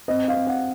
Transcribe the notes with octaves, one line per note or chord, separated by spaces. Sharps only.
C4 D#5
F5
C4
F#5